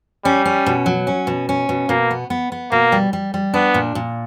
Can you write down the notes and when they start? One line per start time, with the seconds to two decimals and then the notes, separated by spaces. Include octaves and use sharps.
0.25 G3 C#4
0.45 C#4
0.66 B2
0.86 F#3
1.07 C#4
1.27 B2
1.49 C#4
1.69 B2
1.89 B2 A#3
2.11 B3
2.30 B3
2.52 B3
2.71 B2 A#3
2.92 G3
3.13 G3
3.34 G3
3.54 B3 D4
3.74 A#2
3.95 A#2